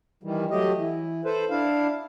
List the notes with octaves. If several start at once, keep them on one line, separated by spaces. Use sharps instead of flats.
D#3 E3 G3
F#3 A3 G4 D#5
E3
A4 B4 C5
D4 E4 F5